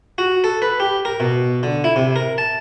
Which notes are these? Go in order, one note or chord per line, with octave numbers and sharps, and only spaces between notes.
F#4
A4
B4
G4
A#4
B2
D3
E4
C3
A#4
A5